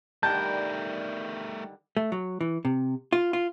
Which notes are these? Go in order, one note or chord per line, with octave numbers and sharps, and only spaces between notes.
D3 D#3 G3 A3 A#4 A5 G6
A3
F#3
E3
C3
F4
F4